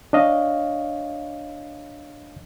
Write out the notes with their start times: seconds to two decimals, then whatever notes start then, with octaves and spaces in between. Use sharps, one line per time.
0.13 D4 C#5 D#5 F5